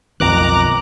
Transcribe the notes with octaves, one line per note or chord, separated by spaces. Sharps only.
B1 F2 D#3 A#5 D6 F#6